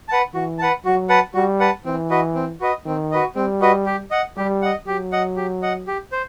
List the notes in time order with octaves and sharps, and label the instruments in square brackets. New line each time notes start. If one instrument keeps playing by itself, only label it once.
[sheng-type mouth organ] B4 F#5 A5
[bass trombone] E3 [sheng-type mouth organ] F#4
[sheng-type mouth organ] B4 F#5 A5
[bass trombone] F#3 [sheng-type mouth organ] F#4
[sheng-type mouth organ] B4 F#5 A5
[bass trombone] G3 [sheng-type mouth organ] F#4
[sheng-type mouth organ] B4 F#5 A5
[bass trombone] E3 [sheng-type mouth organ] C4
[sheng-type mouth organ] F#4 B4 D#5
C4
F#4 B4 D#5
[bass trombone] D#3 [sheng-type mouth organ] C4
[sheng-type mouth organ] F#4 B4 D#5
[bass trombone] G3 [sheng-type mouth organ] C4
[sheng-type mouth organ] F#4 B4 D#5
G4
D#5 F#5
[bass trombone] G3 [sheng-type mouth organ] G4
[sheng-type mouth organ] D#5 F#5
[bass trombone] F#3 [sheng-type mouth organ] G4
[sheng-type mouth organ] D#5 F#5
G4
D#5 F#5
G4
C5